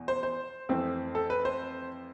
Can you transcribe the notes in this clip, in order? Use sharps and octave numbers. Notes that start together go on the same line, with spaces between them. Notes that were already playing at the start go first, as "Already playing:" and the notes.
Already playing: E2 B2
C5
C5
F2 E3 A3 C4
A4
B4
C5